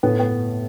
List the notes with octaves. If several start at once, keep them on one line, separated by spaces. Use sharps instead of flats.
A2 B3
B3